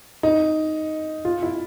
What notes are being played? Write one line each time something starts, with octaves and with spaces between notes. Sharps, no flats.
D#4
F4
E4